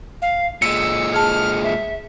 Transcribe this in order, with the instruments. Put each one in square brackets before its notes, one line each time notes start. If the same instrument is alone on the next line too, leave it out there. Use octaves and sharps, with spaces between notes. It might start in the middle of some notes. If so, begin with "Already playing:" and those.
[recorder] F5
[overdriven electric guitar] A#2 G#3 [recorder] E6 [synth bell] C#7
[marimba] G#4 A5 [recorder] F6
[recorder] E5